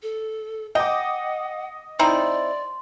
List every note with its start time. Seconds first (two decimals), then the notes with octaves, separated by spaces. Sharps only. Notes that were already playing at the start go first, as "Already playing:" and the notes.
0.03 A4
0.75 D#5 F#5 G5 D6
1.99 C4 D#4 E4 D5 C6